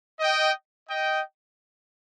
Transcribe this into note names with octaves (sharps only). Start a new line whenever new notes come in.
D#5 G5
D#5 G5